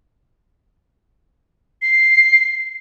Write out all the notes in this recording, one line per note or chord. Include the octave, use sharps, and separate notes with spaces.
C7